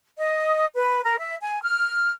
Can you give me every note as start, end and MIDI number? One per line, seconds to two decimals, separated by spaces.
0.17 0.65 75
0.74 1.01 71
1.03 1.16 70
1.17 1.35 76
1.41 1.59 80
1.63 2.10 89